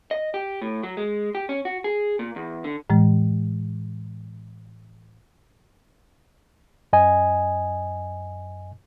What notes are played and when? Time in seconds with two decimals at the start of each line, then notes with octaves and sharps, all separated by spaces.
0.11 D#5
0.34 G4
0.61 A2
0.83 F#3
0.97 G#3
1.35 G4
1.49 C#4
1.65 F#4
1.84 G#4
2.19 A#2
2.36 E2
2.64 D3
2.90 A2 E3 G#3
6.93 F#2 D#5 G#5